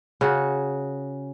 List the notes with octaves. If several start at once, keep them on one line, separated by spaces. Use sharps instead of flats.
C#3 F#4